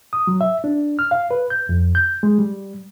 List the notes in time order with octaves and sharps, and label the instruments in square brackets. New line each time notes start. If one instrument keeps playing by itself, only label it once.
[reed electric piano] D#6
F#3
E5
D4
F6
F5
B4
G6
F2
G6
G#3
G3